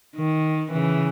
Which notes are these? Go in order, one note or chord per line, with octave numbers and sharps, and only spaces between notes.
D#3
C#3 E3